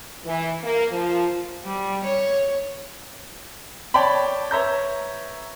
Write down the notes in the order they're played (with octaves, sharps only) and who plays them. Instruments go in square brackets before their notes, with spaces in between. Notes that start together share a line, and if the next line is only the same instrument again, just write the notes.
[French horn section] E3
A#3
F3
[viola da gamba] G3
C#5
[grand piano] C#5 D5 G5 A5 B5
B4 C#5 E5 A#5 G6